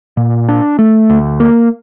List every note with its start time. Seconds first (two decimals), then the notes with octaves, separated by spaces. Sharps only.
0.17 A#2
0.49 D4
0.79 A3
1.10 D2
1.40 A#3